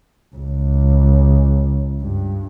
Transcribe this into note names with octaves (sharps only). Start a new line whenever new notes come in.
C#2
G2